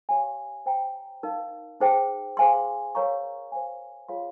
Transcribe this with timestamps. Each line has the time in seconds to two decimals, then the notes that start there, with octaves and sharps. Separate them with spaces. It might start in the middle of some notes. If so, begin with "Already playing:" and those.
0.09 G4 C#5 F5 G#5
0.66 C5 G5 A#5
1.23 D#4 A#4 F5
1.80 D#4 G#4 C5 G5
2.37 G#4 C5 F5 G#5 C6
2.95 A#4 C#5 F5 A#5 C#6
3.52 C5 F5 G#5
4.09 F4 G#4 C#5 F5 C6